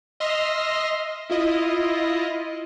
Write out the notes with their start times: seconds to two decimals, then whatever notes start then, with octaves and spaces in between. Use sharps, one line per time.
0.20 D#5 E5 C6 F6 A#6
1.30 E4 F4 D#5